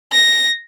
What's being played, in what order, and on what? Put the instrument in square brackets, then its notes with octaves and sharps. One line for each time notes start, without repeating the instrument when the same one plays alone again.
[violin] A#6